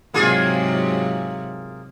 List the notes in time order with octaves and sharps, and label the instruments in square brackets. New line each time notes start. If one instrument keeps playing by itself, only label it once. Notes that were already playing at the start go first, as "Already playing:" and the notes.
[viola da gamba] G#2 C3 F#3 [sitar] A#3 F4 G#4